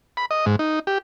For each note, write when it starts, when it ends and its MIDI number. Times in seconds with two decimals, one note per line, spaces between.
0.17 0.26 83
0.31 0.45 75
0.46 0.56 44
0.59 0.79 63
0.87 0.98 67